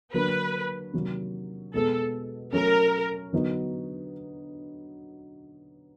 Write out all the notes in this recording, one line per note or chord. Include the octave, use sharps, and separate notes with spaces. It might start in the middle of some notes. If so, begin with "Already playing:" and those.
D3 F#3 A#3 D4 B4
C3 D#3 F#3 A#3
B2 G#3 B3 A4
F#3 A3 C#4 A#4
D3 F#3 B3 D#4 F#4